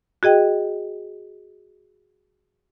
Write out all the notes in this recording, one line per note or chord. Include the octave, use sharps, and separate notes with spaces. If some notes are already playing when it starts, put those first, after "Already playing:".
F#4 G#4 D#5 G5